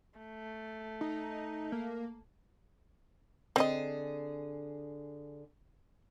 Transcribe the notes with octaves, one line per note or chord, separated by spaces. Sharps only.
A3
D#4
A#3
D3 C4 G#4 D#5